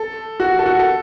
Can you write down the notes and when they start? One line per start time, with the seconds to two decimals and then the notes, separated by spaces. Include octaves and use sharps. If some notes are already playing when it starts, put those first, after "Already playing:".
Already playing: A4
0.40 F#4
0.59 A4
0.66 F#4
0.79 A4